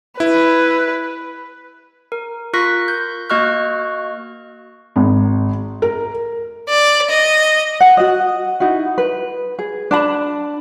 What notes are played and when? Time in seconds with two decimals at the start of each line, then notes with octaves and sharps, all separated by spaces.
0.20 E4 B4
2.12 A#4
2.53 F4 A#4 C#6 F#6 A#6 B6
2.88 G6
3.30 A#3 F#4 D#5 C#6 F6 F#6
4.96 G#1
5.82 A#4
6.69 D5
7.11 D#5
7.81 F#5
7.97 F#4 D#5
8.60 D#4 E4 F#4
8.98 B4
9.59 G#4
9.91 D4 A5 B5